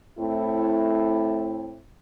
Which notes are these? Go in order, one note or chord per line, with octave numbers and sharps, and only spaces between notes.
A2 A3 C4 E4